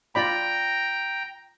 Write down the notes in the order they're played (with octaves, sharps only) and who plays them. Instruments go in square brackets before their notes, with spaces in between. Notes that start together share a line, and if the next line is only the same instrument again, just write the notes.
[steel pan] F4 D5 B5 [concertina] G5 A#5